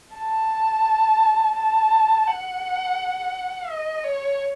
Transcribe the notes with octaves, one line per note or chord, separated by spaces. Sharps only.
A5
A5
F#5
D#5
C#5